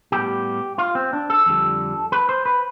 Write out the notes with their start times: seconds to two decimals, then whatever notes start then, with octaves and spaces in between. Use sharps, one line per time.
0.12 A2 G3 B3 G4
0.78 F4
0.95 C4
1.13 D4
1.30 A4
1.46 F2 D3 G3
2.12 B4
2.29 C5
2.46 B4